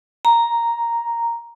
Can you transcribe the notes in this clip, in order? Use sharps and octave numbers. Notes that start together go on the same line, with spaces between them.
A#5